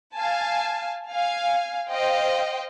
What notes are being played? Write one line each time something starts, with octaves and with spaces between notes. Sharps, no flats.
F5 G#5 A5
F5 G#5
C5 D#5 F5 G5